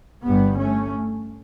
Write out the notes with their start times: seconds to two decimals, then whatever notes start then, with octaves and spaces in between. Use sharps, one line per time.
0.25 G1 G2 G3 B3
0.58 A3 C#4